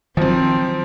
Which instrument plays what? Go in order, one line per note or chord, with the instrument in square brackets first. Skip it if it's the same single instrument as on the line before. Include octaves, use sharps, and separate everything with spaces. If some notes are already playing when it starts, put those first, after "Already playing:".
[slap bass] D#3 F#3 [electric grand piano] F3 [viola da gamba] C4